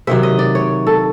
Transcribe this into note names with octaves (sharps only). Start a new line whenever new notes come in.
C3 D#3 F#3 E5
D#5
D5
C#5
A4